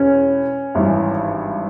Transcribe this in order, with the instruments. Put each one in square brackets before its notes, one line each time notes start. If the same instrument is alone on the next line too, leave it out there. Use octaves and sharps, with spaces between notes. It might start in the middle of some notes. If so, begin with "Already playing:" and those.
Already playing: [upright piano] E1 E2 C#4
G#1 G2 E3